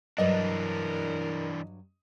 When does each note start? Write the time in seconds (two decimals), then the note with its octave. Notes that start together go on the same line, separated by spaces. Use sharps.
0.18 G2 E3 F#3 D4 A#4 B4 D#5